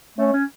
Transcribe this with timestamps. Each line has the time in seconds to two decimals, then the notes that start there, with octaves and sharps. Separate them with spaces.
0.18 A3 C#4
0.33 C#4